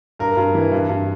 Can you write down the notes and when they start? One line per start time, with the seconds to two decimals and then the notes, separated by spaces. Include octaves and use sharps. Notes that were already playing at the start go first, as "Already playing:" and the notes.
0.19 G2 A#4
0.37 G2
0.55 E3
0.72 G2
0.89 G2